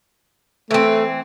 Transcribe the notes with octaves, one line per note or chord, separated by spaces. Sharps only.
E3 A3 C4